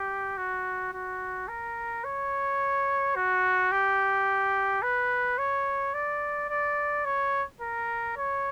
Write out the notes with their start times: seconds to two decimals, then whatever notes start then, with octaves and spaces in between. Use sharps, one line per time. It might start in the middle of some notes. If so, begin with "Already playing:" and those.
Already playing: G4
0.37 F#4
0.93 F#4
1.48 A#4
2.04 C#5
3.16 F#4
3.72 G4
4.82 B4
5.38 C#5
5.94 D5
6.50 D5
7.05 C#5
7.61 A#4
8.17 C#5